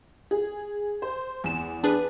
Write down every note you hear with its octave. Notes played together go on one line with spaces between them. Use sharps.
G#4
C5
E2 E7
D4 G#4 B4